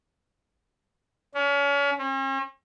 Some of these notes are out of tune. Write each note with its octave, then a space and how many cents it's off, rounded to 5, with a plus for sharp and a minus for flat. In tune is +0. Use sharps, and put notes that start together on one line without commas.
C#4 +35
C#4 -45